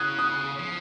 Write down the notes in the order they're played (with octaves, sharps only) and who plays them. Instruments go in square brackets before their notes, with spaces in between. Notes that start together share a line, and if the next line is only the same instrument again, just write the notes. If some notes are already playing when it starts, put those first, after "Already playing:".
Already playing: [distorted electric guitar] C#3 [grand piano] D#6 F#6 G#6
[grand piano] D#6 F#6
[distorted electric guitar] F3